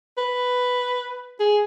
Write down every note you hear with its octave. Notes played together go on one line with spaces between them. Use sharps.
B4
G#4